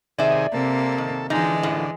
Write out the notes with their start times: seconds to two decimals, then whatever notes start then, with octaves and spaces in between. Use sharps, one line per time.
0.19 C3 D#3 G#4 D5 E5
0.54 C3 A#3 A4
0.98 D#3
1.30 D3 E3 F3 G#3 D#4
1.63 F#2 A2 F3